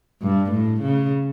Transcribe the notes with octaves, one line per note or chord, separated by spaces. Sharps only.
G2
A2
C#3